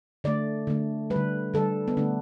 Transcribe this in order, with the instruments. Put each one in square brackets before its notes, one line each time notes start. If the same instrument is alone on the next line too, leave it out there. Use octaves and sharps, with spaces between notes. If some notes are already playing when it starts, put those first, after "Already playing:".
[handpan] D3 A3 D5
D3 A3
G3 B4
D3
D3 G3 A4
B3
D3 A3 D4